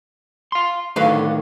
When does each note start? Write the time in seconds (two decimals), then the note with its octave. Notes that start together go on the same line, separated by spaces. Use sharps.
0.52 F5 C6
0.96 A2 D3 D#3 F#3 B4 F5